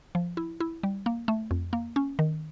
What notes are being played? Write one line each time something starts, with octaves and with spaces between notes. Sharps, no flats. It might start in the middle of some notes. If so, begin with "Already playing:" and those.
F3
E4
E4
G3
A#3
A3
F2
A#3
C#4
D#3